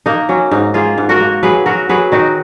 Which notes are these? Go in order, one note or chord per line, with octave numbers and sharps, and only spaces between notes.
A#3 D#4
F#3 C#4
G#2 D#4
A#3 F4 G#4
G#2
F#4 A#4
A#3
F#3 G#4 B4
F#3 F#4 A#4
F#3 G#4 B4
D#3 D#4 F#4